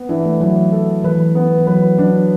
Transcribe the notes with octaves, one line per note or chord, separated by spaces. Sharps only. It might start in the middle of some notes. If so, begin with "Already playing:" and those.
Already playing: B3
E3 D4
A3
E3 F#3
A4
E3 B4
B3
E3
F#3 B4
F#3 D4